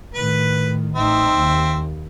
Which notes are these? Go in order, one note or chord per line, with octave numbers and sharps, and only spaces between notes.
A2 D#3 B4
A1 C4 D#4 E5
D#2